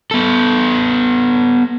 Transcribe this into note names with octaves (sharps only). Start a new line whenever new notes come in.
B3 A4